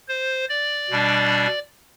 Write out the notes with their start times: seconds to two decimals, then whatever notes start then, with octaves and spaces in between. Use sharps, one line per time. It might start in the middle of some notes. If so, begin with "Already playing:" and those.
0.08 C5
0.49 D5
0.90 B2 G3 D4